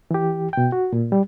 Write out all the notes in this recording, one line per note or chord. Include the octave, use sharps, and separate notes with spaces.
E3 G4
B2 G5
F#4
A#2
G3